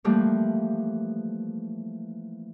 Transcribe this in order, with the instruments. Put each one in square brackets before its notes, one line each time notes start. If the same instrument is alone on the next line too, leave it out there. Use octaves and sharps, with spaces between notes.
[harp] E3 F3 G3 A3 A#3